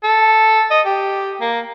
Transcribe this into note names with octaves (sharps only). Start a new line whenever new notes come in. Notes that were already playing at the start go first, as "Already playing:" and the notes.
A4
D#5
G4
A#3